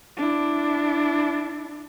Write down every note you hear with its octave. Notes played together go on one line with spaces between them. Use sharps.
D4 E4